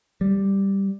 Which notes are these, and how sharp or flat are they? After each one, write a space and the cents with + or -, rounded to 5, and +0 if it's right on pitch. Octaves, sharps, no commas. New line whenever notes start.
G3 +0